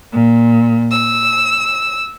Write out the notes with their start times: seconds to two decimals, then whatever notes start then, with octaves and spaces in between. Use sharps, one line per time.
0.13 A#2
0.91 E6